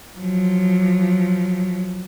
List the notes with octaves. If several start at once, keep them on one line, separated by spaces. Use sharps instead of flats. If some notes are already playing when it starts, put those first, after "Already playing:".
F3 F#3